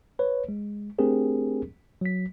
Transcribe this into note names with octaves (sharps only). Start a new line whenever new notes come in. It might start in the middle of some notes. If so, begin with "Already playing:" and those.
B4 C#5
G#3
A3 C4 D4 G4 G#4 A#4
F#3 B6